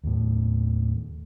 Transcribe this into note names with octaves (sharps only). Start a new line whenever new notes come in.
D#2 A2